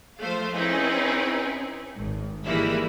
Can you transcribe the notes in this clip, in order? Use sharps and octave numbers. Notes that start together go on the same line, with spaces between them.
F3 A3 C5 F5
C4 C#4 D#4 E4 G#4 B4
G#1
D#3 E3 G3 G#3 A#3 E4